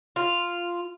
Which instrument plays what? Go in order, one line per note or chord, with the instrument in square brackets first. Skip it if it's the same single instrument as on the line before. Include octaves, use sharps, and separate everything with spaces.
[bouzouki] F4